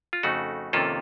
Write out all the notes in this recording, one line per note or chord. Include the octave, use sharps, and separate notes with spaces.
F4
F2 C#3 A3 D#4 F#4
F2 C3 D#3 A#3 C#4 F4 A4